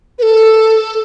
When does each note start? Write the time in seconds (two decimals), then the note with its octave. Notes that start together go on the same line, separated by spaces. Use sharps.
0.19 B4
0.22 A4